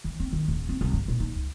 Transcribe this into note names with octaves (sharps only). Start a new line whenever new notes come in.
E3
C4
D#3
D1
C4
C2
G#2
A#2
D#4
C#2